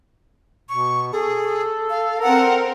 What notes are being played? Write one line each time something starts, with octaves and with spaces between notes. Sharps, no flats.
B2 C#6
G#4 A4
F5
C4 A#4 F#5